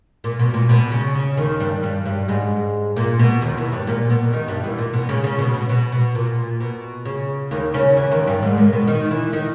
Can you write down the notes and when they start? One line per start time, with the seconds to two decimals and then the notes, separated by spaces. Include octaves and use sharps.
0.24 A#2
0.39 B2
0.54 A#2
0.69 B2
0.92 C#3
1.15 C#3
1.37 D#2 D#3
1.60 G2 G3
1.83 G2 G3
2.06 G2 G3
2.28 G#2 G#3
2.96 A#2 A#3
3.19 B2 B3
3.42 D#2 D#3
3.57 E2 E3
3.72 G2 G3
3.87 A#2 A#3
4.10 B2 B3
4.33 D#3 D#4
4.48 G2 G3
4.64 E2 E3
4.78 A#2
4.94 B2
5.09 C#3
5.24 C#3
5.39 B2
5.54 B2
5.69 B2
5.92 B2
6.15 A#2
6.60 B2
7.05 C#3
7.51 D#2 D#3
7.74 C#3 C#4
7.97 E2 E3
8.12 D#2 D#3
8.27 G2 G3
8.42 G#2 G#3
8.57 A#2 A#3
8.72 B2 B3
8.88 D#3 D#4
9.11 E3 E4
9.33 D#3 D#4